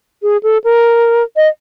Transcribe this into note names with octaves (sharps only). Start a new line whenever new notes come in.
G#4
A4
A#4
D#5